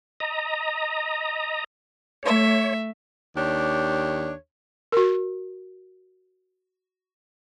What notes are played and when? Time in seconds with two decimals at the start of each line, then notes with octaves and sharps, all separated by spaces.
0.20 D#5 A#5
2.23 A3 C#5 E5
3.36 D#2 D4 G4 C#5
4.92 F#4 A#4